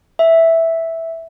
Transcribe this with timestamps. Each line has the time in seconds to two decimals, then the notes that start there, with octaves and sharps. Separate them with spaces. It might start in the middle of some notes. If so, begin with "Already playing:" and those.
0.19 E5